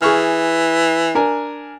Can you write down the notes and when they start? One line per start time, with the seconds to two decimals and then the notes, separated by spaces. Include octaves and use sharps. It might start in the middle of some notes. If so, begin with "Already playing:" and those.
0.02 E3 G#4 C#6 F6
1.15 D4 A#4 G#5